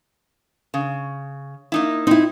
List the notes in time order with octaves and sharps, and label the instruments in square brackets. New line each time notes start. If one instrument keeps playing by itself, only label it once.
[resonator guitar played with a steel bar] C#3
A#3 D#4 E4
[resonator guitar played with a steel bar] C4 [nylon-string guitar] D#4 E4